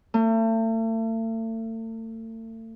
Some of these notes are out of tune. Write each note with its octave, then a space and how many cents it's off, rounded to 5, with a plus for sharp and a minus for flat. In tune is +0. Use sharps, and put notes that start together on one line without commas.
A3 +40